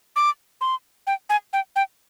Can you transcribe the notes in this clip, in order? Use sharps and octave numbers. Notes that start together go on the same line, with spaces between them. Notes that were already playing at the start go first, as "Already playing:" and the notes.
D6
C6
G5
G#5
G5
G5